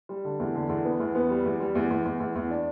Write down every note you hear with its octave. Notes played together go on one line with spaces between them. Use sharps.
G3
D3
E2
D3
E2
B3
E2
B3
G3
E2
G3
E2
E2
E2
E2
E2
D4